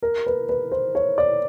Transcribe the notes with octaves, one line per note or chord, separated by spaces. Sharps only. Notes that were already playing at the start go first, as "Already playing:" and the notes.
A#4
B4
B4
C5
C#5
D5